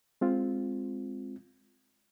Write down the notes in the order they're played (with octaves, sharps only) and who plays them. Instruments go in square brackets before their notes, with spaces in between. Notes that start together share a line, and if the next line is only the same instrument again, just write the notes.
[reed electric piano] G#3 C4 F4